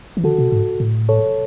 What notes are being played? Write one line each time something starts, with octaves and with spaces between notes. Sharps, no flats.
E3
D3 F#4 A4
B2
G#2
A2
A4 C#5